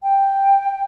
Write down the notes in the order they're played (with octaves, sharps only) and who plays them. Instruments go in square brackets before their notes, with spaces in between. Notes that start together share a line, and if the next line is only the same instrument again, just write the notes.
[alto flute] G5